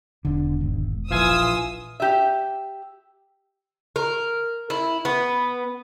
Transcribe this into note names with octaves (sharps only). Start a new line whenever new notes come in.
E1 D3 D4
G#1
A#1 E3 F4 G#5 D#6 E6
G4 E5
A#4
E4
B3